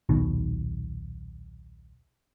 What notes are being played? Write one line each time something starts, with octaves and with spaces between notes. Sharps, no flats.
D#1 B1 B2 D#3